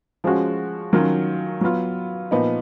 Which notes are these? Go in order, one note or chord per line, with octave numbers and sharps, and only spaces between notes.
F3 G#3 C#4 F#4
D#3 F#3 C#4 F4
F#3 B3 F4
A#2 F3 B3 D#4